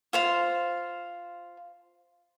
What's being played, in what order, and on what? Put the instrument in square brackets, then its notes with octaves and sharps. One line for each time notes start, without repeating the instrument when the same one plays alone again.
[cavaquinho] F4 C5 F5